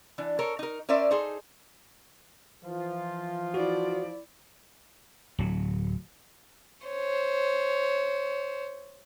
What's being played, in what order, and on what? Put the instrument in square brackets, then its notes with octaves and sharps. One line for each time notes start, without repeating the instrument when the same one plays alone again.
[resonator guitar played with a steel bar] E3 D4
A4 A#4 C#5
D#4 A#4
C#4 A#4 C5 D5 E5
D#4 G#4 A4 C5
[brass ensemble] E3 F3 F4
[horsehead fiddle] E4 D5 [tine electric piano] F#4
[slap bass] D1 F#3
[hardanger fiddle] C5 C#5